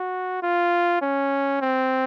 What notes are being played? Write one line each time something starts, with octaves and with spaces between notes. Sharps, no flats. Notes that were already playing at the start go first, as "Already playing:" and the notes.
Already playing: F#4
F4
C#4
C4